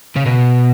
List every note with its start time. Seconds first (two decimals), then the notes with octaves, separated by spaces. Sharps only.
0.16 C#3
0.26 B2